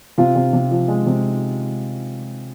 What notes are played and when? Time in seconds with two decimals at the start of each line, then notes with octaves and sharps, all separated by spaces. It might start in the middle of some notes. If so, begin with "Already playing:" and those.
0.18 C3 F4
0.35 C3
0.53 C3
0.71 F3
0.88 G#3
1.06 C3